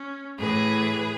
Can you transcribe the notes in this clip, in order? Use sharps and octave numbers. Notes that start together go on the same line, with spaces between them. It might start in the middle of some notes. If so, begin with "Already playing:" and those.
Already playing: C#4
A2 E3 A3 E4 G#4 B4